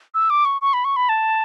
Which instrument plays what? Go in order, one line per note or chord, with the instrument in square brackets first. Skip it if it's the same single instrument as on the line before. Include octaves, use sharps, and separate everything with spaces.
[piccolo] E6
D6
C#6
C#6
B5
C#6
B5
A5